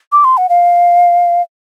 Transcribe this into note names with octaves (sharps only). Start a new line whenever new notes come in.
D6
C6
F#5
F5